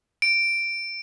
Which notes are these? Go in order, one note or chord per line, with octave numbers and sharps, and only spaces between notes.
D7